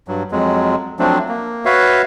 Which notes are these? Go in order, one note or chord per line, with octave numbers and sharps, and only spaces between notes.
G2 F#3
F2 F#3 G#3
F3 F#3 A3 C4 D4
A#3
F#4 B4 C#5 E5 F5